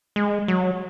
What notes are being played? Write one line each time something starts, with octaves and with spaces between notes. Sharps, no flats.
G#3
F#3